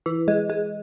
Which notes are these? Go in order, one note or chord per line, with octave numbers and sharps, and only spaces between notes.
E3
G#3
G#3